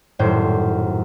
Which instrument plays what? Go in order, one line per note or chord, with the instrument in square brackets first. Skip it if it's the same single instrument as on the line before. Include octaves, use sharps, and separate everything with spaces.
[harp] D#1 F#2 A2 C5 G6